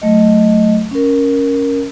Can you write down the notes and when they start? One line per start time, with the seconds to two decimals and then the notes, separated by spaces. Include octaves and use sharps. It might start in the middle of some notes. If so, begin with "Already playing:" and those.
0.02 F#3 A3 D#5
0.91 C#4 A#4